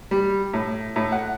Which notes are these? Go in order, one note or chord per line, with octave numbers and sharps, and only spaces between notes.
G3
A2
A2
F#5